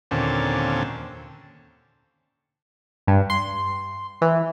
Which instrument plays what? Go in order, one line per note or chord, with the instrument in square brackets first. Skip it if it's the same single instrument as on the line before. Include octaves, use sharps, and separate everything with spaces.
[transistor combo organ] D#2 A#2 D3 C4 C#4 A5
[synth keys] G2
C6
E3